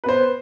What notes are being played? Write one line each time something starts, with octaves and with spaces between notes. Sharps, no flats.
B3 B4 C5